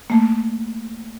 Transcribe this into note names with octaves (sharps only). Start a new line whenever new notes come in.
A3 A#3